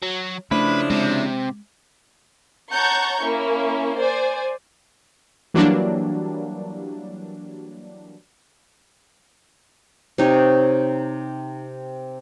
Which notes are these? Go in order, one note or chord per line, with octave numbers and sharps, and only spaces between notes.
F#3
C#3 F3 A3 D4 E4 B4
C3 G#3
C#5 F#5 A5 A#5 C#6 G6
A#3 C#4 E4
C5 D5 G#5
E3 F#3 G3 A#3 D4
C3 D#4 C#5